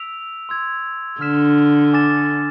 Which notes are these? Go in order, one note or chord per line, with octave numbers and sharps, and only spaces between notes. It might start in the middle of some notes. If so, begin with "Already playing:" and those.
Already playing: E6 B6 D7 F7
C6 E6 G#6
D3 F6 B6 E7
G#5 D6 A6 E7